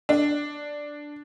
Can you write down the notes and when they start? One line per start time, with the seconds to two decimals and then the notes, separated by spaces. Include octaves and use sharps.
0.09 D4